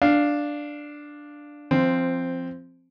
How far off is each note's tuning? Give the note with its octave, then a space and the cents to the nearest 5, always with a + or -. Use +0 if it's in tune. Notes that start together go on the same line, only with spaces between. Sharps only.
D4 +0 F5 +0
F3 -15 C4 +0